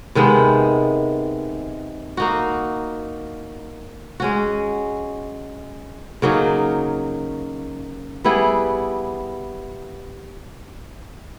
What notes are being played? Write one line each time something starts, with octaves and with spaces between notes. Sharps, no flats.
C3 D#3 G#3 B3
A#3 D#4 F#4
G#3 C#4 F#4
C#3 F#3 A#3 D#4
G3 B3 E4 G#4